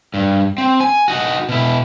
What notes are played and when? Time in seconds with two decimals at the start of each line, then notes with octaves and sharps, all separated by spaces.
0.14 G2
0.58 C4
0.80 G#5
1.08 D#4 F#4
1.49 B2 E4